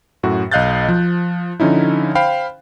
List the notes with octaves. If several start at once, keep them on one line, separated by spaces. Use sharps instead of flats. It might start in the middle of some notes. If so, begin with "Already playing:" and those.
F#2 A2 F#4
B1 D#5 F5 F#6 G6 A6
F3
D3 F3 C#4 D#4 E4
C5 F5 G5 B5